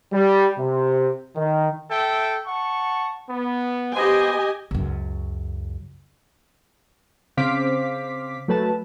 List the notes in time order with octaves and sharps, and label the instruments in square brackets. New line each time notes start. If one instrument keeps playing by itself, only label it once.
[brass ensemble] G3
C3
D#3
[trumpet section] A4 E5 G5
F#5 A5 C#6
B3
[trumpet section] B3 C5 [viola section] G4 D#5 G#5
[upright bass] C#2 F#2
[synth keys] C#3 C4 C5 F5 D6 B6
F#3 A3 B4 A5